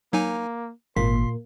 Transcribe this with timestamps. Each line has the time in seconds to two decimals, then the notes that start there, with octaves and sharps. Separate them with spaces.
0.13 F#3 A#3 D#4 G#5
0.97 G#1 A#2 A#3 C6 B6